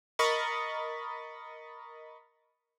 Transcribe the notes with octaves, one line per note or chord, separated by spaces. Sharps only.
A#4 D#5 B5 C#6 A6